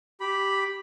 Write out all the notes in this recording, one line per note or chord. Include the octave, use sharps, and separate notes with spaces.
G4 B5